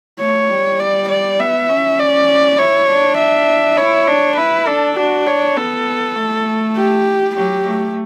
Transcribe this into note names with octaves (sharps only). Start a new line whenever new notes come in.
A3 C#5
G3
D5
D5
B3 E5
C#4
D5
E4 C#5
D4
E5
E4 C#5
D4
E4 B4
D4 A4
D4 F#4
C#5
B3 A4
A3
G4
F#3 G4
A3